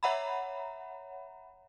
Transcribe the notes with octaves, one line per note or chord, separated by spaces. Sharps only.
C#5 E5 F#5 A#5 B5